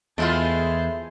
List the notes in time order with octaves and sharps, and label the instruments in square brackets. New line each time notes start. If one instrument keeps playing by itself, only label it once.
[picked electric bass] E2 [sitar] G#3 [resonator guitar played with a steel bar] A3 E4 F4 [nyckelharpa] C5 A5